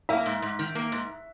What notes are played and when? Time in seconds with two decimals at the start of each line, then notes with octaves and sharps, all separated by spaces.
0.09 A#3 E5
0.26 G#2
0.42 G#2
0.59 D#3
0.75 A#3
0.92 G#2